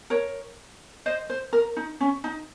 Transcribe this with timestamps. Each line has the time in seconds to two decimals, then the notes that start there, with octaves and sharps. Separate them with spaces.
0.10 A#4 C#5
1.06 C5 D#5
1.30 C5
1.53 A#4
1.77 D#4
2.01 C#4
2.24 D#4